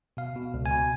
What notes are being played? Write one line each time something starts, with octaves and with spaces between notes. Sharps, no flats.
B2 F5
B2
C#2
G#5
B2